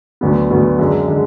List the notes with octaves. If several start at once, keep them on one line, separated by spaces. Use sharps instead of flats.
D2 D3 F#3 B3
D2 D3 F#3 B3
F#2 D3 G#3
D3 G#3